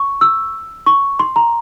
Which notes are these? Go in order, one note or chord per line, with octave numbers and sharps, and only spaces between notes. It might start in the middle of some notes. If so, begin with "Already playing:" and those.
Already playing: C#6
E6
C#6
C6
A#5